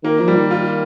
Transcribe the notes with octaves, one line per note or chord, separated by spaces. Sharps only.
D#3 A#3
F3
G3
D#3
F4